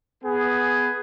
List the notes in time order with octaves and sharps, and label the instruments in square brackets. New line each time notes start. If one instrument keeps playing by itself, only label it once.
[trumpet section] B3 G#4